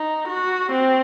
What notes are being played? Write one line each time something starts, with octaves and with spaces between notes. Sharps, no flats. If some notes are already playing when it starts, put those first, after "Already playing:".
Already playing: D#4
F#4
C4